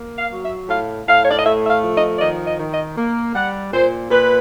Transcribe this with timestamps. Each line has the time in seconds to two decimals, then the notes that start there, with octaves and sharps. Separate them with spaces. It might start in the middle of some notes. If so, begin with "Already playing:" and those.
Already playing: A#3
0.18 F5
0.31 F#3
0.44 E5
0.69 A2 F5
1.07 A2 F5
1.23 C#5
1.31 D5
1.38 D#5
1.45 A3 E5
1.66 E5
1.70 F5
1.83 F3
1.96 D#5
2.16 D5
2.21 D#3 D#5
2.46 D#5
2.59 D#3
2.72 D#5
2.97 A#3
3.35 G3 F#5
3.73 A#2 C5
4.10 A#2 B4